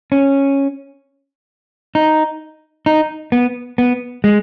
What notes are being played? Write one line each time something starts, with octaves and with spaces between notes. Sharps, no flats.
C#4
D#4
D#4
B3
B3
G#3